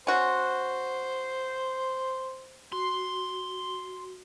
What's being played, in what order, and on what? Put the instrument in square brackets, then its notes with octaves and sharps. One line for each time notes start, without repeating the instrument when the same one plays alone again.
[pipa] C#4 F#4 [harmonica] C5
[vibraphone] F#4 [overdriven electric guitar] C6